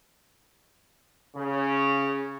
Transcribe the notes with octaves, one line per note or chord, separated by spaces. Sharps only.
C#3